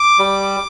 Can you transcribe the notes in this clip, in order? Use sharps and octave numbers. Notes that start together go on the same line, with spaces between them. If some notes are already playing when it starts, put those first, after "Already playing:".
Already playing: D6
G3